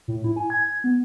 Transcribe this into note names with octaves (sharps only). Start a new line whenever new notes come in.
A2
E4
G#5
G#6
B3